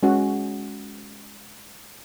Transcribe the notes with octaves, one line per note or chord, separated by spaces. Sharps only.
G#3 C#4 F#4